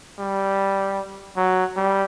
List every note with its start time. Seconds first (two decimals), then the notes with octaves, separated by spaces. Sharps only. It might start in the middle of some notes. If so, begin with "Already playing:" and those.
0.19 G3
1.37 F#3
1.76 G3